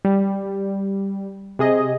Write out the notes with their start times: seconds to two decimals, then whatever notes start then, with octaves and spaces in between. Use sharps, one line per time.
0.05 G3
1.59 C3 G#4 D#5